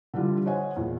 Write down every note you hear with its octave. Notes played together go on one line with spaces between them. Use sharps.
D3 E3 G3 F4
C5 C#5 D#5 F#5 G#5
E2 A#2